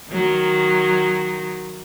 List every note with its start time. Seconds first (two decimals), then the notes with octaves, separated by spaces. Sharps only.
0.11 D#3 F#3